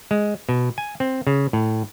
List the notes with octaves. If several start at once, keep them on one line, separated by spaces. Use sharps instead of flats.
G#3
B2
G#5
C4
C#3
A2